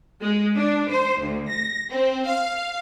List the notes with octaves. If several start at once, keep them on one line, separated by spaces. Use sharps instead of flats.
G#3
D4
C5
D2
A#6
C4
F5